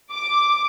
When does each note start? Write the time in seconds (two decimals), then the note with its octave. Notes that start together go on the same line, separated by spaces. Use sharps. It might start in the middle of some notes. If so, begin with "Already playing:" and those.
0.11 D6